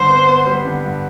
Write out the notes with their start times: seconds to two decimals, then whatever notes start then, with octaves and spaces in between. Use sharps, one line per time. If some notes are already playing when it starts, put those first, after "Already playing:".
Already playing: G2 D3 C5
0.09 B3
0.28 B3
0.46 G3
0.65 D3
0.84 G2